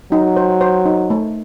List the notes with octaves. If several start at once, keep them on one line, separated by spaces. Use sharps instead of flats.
F#3 D#4
C5
C5
D#4
A3